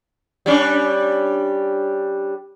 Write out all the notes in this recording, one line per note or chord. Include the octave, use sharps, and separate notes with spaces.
G3 C#4 D4